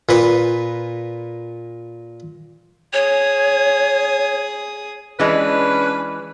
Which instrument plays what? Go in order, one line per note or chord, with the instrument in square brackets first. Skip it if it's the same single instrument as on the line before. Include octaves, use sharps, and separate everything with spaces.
[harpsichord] A#2 B4
[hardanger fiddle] G#4 D#6 [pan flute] C#5
[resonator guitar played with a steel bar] E3 G#3 [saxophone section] C#4 D4 B4